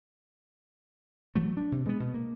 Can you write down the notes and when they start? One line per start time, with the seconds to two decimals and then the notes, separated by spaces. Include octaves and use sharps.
1.35 E3 F#3 A3
1.57 D4
1.72 C3
1.85 B2 G#3 A3 B3
2.00 B2
2.14 A#3